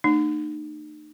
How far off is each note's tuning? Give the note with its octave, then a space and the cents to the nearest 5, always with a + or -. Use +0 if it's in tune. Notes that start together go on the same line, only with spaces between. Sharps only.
A3 +40 D#4 -40